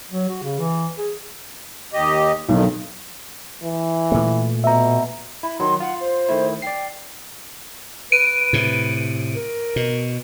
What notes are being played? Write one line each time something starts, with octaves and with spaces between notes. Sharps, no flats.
F#3
F#4
C#3
E3
G#4
D#2 G4 D#5
B1 F2 D#3
E3
A#2 A3
B2 E5 A#5
E4 B5
D#3 F#3 C6
F4 F#5
C5
D#3 A3 E4
D5 G5 C7
B4 D7 D#7
A2 C3
A#4
B2